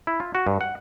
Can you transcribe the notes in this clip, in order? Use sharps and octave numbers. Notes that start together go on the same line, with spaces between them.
E4
F4
F#4
G2
F#5